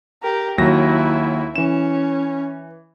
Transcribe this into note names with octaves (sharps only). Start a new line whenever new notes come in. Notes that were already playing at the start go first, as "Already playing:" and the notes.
G4 A#4
D#2 F#3 E4 A#6
E3 C#4 E7